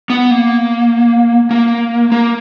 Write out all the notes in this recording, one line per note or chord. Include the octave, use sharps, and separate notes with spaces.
B3
A#3
A#3
A#3